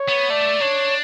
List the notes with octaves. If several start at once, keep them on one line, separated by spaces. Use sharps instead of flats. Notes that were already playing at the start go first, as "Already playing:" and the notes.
Already playing: C#5
B3
A3 D5
D4 C#5